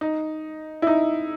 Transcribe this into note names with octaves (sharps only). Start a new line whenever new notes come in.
D#4
E4
D#4